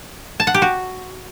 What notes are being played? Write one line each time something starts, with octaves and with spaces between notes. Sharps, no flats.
A5
F#5
G4
F#4